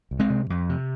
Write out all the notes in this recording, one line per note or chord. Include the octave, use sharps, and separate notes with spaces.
C2
G#3 C4
C3
F2
C3